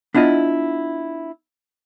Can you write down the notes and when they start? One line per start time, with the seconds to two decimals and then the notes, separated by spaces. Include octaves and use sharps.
0.14 B3 D4 E4 F4 D#5